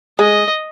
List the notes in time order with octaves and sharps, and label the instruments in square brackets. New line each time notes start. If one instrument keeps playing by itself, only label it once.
[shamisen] G#3 [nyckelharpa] D#5